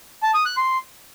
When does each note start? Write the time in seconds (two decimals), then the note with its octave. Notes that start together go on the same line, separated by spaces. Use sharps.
0.23 A5
0.34 D#6
0.46 F#6
0.57 C6